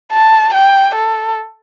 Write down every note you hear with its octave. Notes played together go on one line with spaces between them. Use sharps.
A5
G5
A4